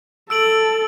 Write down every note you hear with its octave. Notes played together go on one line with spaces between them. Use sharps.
A4 E6 D7 F#7